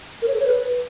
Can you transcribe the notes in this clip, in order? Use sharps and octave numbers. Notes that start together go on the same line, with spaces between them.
A#4
C#5
A4
C#5
B4